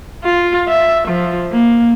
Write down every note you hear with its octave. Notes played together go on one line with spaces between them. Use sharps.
F4
E5
F3
A#3